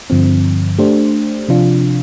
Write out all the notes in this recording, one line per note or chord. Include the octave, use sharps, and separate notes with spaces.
G2 D3 F3 C4
A3 D4 G4 C5
C3 F3 D4 F4